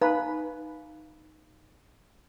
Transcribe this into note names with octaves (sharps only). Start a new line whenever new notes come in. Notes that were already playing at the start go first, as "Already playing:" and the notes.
D#4 B4 F5 A#5